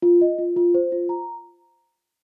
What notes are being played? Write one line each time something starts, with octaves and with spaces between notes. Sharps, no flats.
F4
D#5
F4
F4
C5
F4
A#5